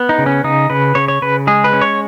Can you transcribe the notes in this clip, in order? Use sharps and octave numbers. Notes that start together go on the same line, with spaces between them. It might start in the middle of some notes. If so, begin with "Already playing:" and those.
Already playing: B3
D#4
C#3
C#4
C#3 D#4
C#3 B4
C#3 C#5
C#5
C#3 B4
G#3 G#4
B4
C#4
C#5